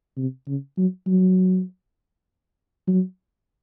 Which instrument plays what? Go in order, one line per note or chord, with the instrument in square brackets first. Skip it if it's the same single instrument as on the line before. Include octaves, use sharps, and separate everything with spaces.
[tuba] C3
C#3
F#3
F#3
F#3